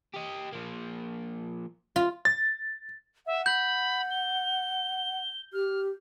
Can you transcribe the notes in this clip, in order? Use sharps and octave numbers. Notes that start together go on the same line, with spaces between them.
G4 D#5
F3 A#3
F4
A6
E5 F#5
B5 G6
G7
G4 F6